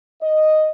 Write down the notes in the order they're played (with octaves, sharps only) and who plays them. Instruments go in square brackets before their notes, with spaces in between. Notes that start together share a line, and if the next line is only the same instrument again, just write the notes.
[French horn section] D#5